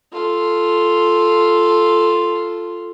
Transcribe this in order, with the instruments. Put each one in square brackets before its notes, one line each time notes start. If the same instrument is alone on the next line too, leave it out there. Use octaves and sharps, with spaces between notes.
[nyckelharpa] F4 A4